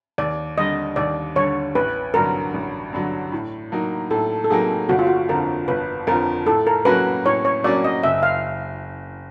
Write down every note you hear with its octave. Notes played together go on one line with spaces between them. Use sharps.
D#2 D5
D3 G3 D#5
D#2 D5
D3 G3 C#5
A1 B4
G2 D3 F#3 A#4
A1
G2 D3 F#3
A2
F#3 A#3 D#4
A2 A4
A4
F#3 A#3 D#4 G#4
G1 F#4
F4
F#4
F2 D3 F3 A#4
G1 B4
F2 D3 F3 A#4
A2 A4
A#4
F#3 A#3 C#4 F#4 B4
A2 C#5
C#5
F#3 A#3 C#4 F#4 D5
D#5
F#1 E5
F5